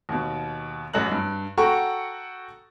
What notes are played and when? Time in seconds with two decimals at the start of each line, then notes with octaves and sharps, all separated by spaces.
0.09 D#2 B2
0.94 A1 F#2 D#5 F#6 F#7
1.11 G2
1.57 F#4 A4 F#5 G5 A#5 C#6